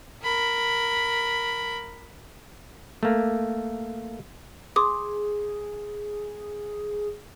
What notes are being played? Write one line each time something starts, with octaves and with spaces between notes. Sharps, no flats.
A#4 B5
A3 A#3
G#4 C6 D6 D#6